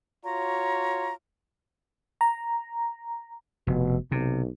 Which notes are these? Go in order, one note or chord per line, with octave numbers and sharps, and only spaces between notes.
F4 F#4 C#5 A#5
A#5
F1 B2
B1 C3